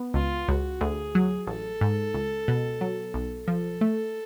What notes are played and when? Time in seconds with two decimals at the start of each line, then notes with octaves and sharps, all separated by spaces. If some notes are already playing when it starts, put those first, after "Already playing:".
Already playing: B3
0.14 C#2 F4
0.48 C#2 F#4
0.81 D2 G#4
1.15 F#3
1.47 A1 A4
1.81 G#2
2.14 C#2
2.48 B2
2.81 F#3
3.14 B1
3.48 F3 A4
3.81 A3